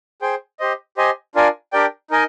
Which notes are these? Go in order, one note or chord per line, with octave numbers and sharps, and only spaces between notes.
G#4 C5 G5
G4 C5 D#5
G4 C5 D#5 G#5
D4 F4 A#4 D5 G#5
D4 G4 A#4 D5 G5
D#4 A#4 D#5 G#5